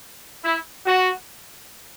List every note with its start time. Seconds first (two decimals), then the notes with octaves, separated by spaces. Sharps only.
0.44 E4
0.85 F#4